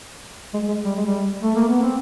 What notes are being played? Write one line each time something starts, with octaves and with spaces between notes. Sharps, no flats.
G#3
G#3
G3
G#3
G3
A3
A#3
B3
C4